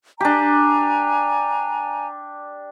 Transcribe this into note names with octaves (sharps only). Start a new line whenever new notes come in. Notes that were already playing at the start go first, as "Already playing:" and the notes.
D4 G4 G#5 A#5